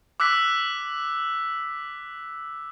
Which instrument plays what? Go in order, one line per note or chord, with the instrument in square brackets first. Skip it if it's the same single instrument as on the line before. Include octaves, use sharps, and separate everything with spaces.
[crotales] D6 E6 F#6 B6